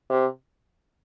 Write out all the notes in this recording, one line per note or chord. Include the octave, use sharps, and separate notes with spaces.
C3